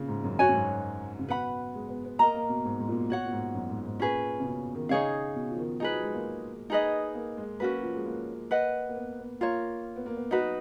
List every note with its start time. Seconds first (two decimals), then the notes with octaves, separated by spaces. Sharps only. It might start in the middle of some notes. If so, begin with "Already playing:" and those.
Already playing: A#2 C#3
0.08 G#2
0.24 F#2
0.39 F#2 F#4 C#5 G#5
0.49 F#2
0.54 G#2
1.19 C#3
1.28 B2 B4 F#5 B5
1.74 G#3
1.89 B3
2.05 B3
2.19 A#3 A#4 D#5 A#5
2.35 A#3
2.49 B2
2.65 G#2
2.80 G#2
2.89 A#2
2.94 B2
3.09 B2 F#4 C#5 F#5
3.25 A#2
3.32 G#2
3.54 F#2
3.70 G#2
3.85 G#2
4.00 A#2 C#4 G#4 B4
4.40 C#3
4.45 B2
4.75 D#3
4.89 C#3 D#4 G#4 C#5 F5
5.35 B2
5.51 F3
5.58 D#3
5.80 F3 D#4 G#4 B4
5.91 F#3
6.03 G#3
6.15 A#3
6.70 D#4 G#4 B4 D#5
7.15 A#3
7.37 G#3
7.60 A#3 C#4 F#4 B4
7.71 F#3
7.83 F3
7.95 G#3
8.06 A#3
8.51 B4 D#5 F#5
8.89 A#3
8.95 B3
9.19 B3
9.41 A#3 F4 A#4 C#5
9.96 B3
10.06 A#3
10.16 B3
10.31 B3 D#4 F#4 B4
10.40 F#3